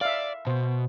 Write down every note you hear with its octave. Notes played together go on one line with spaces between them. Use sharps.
D5 E5 F5
B2 C5